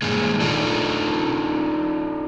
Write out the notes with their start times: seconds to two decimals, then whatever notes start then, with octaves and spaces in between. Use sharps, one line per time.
0.02 G2 A#2 D#3 G#3
0.40 D4 D#4 F4 A4